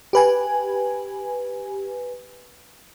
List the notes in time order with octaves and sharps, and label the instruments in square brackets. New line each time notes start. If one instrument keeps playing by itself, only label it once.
[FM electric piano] G4 B4 G#5